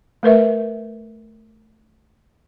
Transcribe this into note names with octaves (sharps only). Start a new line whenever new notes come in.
A3 A#4 B4 E5